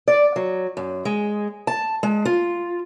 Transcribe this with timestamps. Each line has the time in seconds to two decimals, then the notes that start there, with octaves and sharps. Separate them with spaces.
0.08 D5
0.36 F#3
0.77 F#2
1.05 G#3
1.67 A5
2.03 G#3
2.25 F4